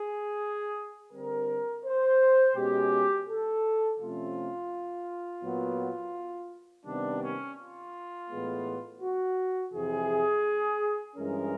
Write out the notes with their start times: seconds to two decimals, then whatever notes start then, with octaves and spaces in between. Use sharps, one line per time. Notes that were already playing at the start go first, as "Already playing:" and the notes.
Already playing: G#4
1.12 D3 G3 C4 A#4
1.85 C5
2.56 B2 G#3 C#4 G4
3.27 A4
3.99 C3 F3 A3 C#4 F4
5.43 A#2 F#3 B3
6.86 C3 D#3 G3 B3 D4
7.21 C#4
7.58 F4
8.29 A2 E3 G#3 B3
9.01 F#4
9.73 F2 C3 E3 G#4
11.16 G2 E3 G#3 C#4 A#4